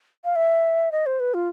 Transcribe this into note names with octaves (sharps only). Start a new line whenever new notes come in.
F5
E5
D#5
C5
B4
F4